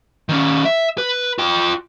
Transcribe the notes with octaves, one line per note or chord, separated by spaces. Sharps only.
D#3 C#4
E5
B4
F4 G5